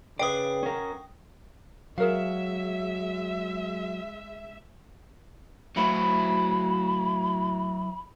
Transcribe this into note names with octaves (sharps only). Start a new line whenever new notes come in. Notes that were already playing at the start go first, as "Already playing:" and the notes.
C#3 B4 D5 G5 D#6
C#4 A#4
F#3 G#3 G#4 A#4 E5 F5
A2 F#3 A3 E4 B5